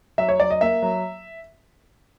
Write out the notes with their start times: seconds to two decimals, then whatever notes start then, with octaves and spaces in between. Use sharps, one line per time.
0.18 F#3 E5
0.29 C#5
0.40 F#3 D5
0.50 D#5
0.61 A#3 E5
0.82 F#3